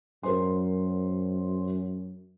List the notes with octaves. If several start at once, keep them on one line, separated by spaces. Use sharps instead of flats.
F#2 A#4 C5 C6